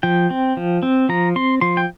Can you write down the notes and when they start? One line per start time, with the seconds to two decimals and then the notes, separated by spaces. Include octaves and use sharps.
0.03 F3 G5
0.30 C4
0.57 F3
0.83 C4
1.09 F3 A#5
1.36 C4 C6
1.61 F3 C6
1.77 G5